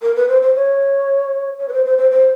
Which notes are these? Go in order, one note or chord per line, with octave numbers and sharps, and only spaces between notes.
A#4
B4
C5
C5
C#5
C#5
B4
C5
C5
C5
C5